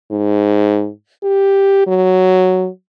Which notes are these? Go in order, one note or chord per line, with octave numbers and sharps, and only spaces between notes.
G#2
G4
F#3